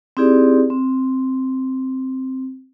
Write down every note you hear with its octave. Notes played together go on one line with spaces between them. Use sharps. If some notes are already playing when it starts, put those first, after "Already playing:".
C4 D#4 E4 G4 G#4 D5
C4